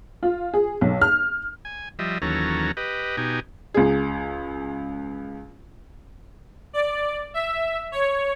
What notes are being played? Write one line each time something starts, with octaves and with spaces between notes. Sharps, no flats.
F4
G#4
B1
F6
G#5
F3 G3 D#5 E5
D#2 E3 F#3 C#4 A4 A#5
G4 B4 D#5
B2 D#4 G4 G#5
C#2 G#4
D5
E5
C#5